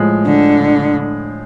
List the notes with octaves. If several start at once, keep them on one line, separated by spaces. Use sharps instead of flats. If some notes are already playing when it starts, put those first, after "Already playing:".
Already playing: A2 F3 G#3
D3